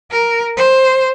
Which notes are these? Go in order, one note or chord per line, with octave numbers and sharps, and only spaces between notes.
A#4
C5